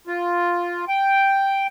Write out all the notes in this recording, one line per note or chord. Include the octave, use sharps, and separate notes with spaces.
F4
G5